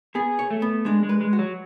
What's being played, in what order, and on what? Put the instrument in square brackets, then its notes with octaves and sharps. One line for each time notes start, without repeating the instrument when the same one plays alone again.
[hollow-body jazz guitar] B3 [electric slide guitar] G#4
[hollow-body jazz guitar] C#5
[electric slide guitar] A3
[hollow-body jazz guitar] B3
[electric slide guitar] G#3 [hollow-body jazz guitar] D4
[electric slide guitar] G#3
[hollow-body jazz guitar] B4
[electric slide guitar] G#3
[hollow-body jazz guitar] F#4
[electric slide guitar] F#3